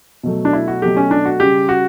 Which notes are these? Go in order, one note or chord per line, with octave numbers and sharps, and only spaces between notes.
B2 F#3 A3
D4
E4
F#4
B2 F#3 A3 G4
C#4
D4
F#4
C#3 G3 G4
F#4